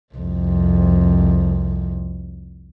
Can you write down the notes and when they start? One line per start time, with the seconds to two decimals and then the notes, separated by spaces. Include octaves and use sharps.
0.14 C2 F2